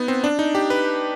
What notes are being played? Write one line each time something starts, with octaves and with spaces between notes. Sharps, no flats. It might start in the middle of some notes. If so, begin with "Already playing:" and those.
Already playing: B3 D#4
C4
D4
D#4
G4
B4